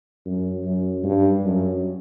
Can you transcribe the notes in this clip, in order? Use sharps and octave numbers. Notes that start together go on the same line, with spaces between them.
F#2
F#2
G2
F#2